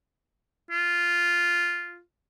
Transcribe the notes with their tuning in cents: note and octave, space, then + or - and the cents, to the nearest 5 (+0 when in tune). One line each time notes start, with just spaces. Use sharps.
F4 -5